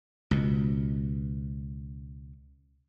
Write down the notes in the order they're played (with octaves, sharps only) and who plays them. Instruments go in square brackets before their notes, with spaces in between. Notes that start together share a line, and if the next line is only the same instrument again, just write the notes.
[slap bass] C#2 B2